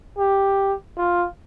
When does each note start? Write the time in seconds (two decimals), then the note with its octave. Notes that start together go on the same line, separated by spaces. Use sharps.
0.18 G4
0.98 F4